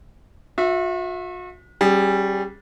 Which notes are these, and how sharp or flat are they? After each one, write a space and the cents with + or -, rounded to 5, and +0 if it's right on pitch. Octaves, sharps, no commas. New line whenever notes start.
F#4 -45 E5 +0
G3 -10 C#4 -25 G#4 -30